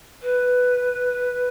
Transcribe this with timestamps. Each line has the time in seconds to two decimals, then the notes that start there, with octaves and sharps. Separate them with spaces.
0.22 B4